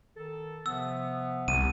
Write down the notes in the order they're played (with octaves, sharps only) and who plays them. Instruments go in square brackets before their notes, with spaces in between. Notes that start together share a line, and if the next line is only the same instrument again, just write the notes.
[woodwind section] D#3 A4
[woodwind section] C3 F3 B3 [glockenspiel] E6
[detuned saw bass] C2 [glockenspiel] D#7